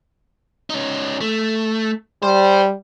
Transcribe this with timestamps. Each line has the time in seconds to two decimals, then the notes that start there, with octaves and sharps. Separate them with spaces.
0.70 C#4 D#4
1.21 A3
2.23 G3 C5